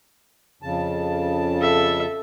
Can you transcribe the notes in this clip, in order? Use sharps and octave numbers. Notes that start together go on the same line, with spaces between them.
F2 C#3 A5
A4 E5